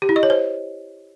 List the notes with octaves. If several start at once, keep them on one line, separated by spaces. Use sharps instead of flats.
G4
E4
D#5
C#5
C5